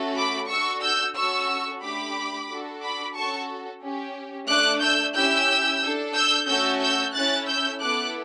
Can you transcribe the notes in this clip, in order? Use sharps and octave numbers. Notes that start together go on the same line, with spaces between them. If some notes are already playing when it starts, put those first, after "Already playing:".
Already playing: A3 C#4 F#4 A4
B5 D6
D4 F#4 A4 C#6 E6
E6 G6
C#4 F#4 A4 C#6 E6
A3 D4 G4 B5 D6
D4 F#4 A4
B5 D6
C#4 F#4 A4 A5 C#6
C#4 G4
A3 D4 A4 D6 F#6
E6 G6
C#4 E4 G4 E6 G6
D4 A4
E6 G6
A3 C#4 F#4 A4 E6 G6
E6 G6
C#4 E4 A4 F#6 A6
E6 G6
B3 E4 A4 D6 F#6